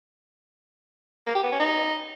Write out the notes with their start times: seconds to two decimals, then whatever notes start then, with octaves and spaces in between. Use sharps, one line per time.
1.27 A#3
1.35 G4
1.43 B3
1.52 C#4
1.60 D#4